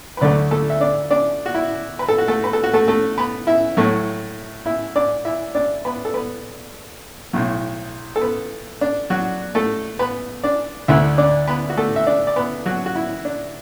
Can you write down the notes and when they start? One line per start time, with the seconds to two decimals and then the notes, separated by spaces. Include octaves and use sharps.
0.17 B4
0.21 D2 D3 F#3 A3 D4 D5
0.51 A3 A4
0.70 E5
0.80 D4 D5
1.10 D4 D5
1.46 F#4
1.55 E4
1.99 B4
2.09 A4
2.18 F#4
2.28 A3 A4
2.44 B4
2.53 A4
2.64 F#4
2.73 A3 A4
2.88 A3 A4
3.18 B3 B4
3.47 E4 E5
3.77 A2 F#3 A3
4.66 E4 E5
4.96 D4 D5
5.25 E4 E5
5.55 D4 D5
5.85 B3 B4
6.05 A4
6.14 B3 B4
7.33 B1 A2 F#3
8.16 A4
8.21 B3 B4
8.81 D4
9.10 F#3 F#4
9.55 A3 A4
9.99 B3 B4
10.44 D4 D5
10.88 D2 D3 A3 E4 E5
11.18 D4 D5
11.47 B3 B4
11.70 F#4
11.77 A3 A4
11.96 E5
12.07 D4 D5
12.27 D5
12.36 B3 B4
12.66 F#3 F#4
12.86 F#4
12.96 E4
13.25 D4